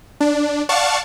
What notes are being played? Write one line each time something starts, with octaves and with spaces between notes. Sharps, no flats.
D4
D5 F5 F#5 A5 C#6